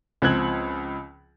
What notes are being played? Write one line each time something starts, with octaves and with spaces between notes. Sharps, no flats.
C#2 F3 C4 F#6 G#6 F#7